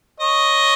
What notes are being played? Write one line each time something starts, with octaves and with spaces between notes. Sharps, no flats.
C#5 D#5